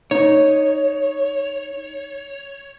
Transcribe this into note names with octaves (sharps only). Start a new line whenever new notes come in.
D#4 C#5